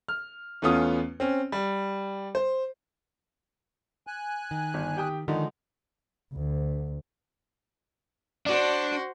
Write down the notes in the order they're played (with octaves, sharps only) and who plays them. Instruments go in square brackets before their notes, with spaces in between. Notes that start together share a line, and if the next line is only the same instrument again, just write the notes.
[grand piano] F6
E2 A3 B3 C#4 F4 D#6
C4 C#4
G3
C5
[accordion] G#5 F#6
[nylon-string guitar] D#3
[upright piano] G1
G4 G5 D#6
[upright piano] D3 F3 D#4 [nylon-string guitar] D#3 [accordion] G#3
[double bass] D2
[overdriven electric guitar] D4 [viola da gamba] F#4 C5